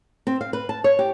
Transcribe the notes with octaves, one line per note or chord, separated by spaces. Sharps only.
C4
F5
B4
A5
C#5
G4